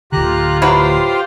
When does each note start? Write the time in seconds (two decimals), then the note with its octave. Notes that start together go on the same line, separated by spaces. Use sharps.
0.12 D1 D3 F4 G4 A#5 F#6
0.62 F#3 E4 G4 B4 C5 G5